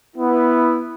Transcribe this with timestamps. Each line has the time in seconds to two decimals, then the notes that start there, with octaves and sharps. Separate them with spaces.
0.16 B3 E4